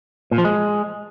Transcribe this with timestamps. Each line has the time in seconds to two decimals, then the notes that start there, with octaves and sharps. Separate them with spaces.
0.31 A#2
0.38 F3
0.45 G#3